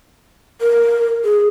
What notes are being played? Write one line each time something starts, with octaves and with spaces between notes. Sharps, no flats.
A#4
G#4